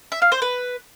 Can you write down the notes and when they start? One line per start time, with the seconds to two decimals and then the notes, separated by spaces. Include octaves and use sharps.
0.12 E5
0.22 F5
0.32 C5
0.42 B4